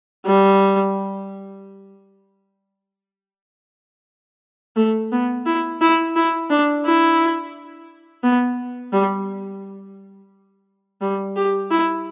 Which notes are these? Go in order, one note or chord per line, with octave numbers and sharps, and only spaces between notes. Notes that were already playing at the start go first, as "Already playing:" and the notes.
G3
A3
B3
E4
E4
E4
D4
E4
B3
G3
G3
G4
E4